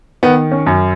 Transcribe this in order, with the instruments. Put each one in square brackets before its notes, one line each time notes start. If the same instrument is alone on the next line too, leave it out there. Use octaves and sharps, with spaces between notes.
[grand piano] D#3 B3
C#4
F#2